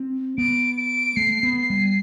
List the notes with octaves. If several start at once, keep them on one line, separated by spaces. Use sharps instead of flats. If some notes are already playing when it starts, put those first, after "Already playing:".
Already playing: C4
B3 D7
D7
A3 C7
B3
C7
G3